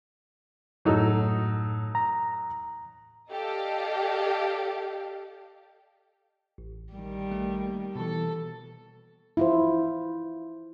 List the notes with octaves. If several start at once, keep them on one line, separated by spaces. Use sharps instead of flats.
F#2 A2 F#3 D#4 A4
A#5
G4 A4 D5 D#5 F5
A1
D#3 G3
A3
A#3
B2 E3 A4
E4 F4 C5